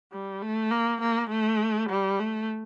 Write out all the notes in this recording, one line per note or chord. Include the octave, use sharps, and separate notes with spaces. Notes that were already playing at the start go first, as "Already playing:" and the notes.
G3
A3
A#3
A#3
A3
G3
A3